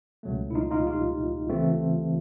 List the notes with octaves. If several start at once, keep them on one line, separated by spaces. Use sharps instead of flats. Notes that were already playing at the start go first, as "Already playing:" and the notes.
C#2 B2 F#3 A3
E4
D#4 F4
D#4 F4
F4 G4
D2 C#3 E3 A3 C4